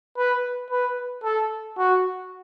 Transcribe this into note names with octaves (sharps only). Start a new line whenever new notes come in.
B4
B4
A4
F#4